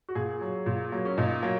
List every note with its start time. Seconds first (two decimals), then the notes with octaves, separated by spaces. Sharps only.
0.09 F#4
0.15 A#2 G#4
0.41 F#3
0.66 A#2
0.92 F#3 A#3
1.05 C#4
1.18 A#2 D#4
1.43 F#3 A#3